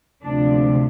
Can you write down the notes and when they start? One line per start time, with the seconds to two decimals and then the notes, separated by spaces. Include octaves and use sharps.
0.24 D2 C3 F3 G#3 D4